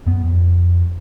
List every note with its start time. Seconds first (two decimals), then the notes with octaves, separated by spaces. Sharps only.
0.06 F#2 B3
0.24 F2